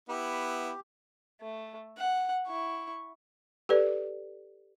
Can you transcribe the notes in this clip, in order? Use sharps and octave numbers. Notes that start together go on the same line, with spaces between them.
B3 E4 G4
A3
F#5
E4 C#6
G4 A4 B4 D5